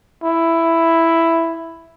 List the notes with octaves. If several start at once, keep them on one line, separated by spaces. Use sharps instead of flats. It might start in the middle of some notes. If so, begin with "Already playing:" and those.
E4